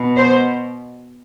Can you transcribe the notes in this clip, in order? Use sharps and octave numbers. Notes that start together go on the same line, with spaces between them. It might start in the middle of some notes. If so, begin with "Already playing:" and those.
Already playing: B2
C5